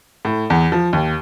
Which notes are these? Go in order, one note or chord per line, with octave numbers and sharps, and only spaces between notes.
A2
E2
F3
D#2